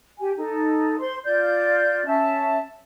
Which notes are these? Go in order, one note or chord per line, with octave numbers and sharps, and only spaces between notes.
G4 G#5
D#4 A4
C5 C6
F4 D5 G6
C#4 E5 A5